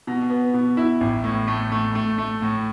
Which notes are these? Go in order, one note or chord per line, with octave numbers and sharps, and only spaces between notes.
B2
B3
B2
E4
A1
A2
A3
A3
A3
A3
A2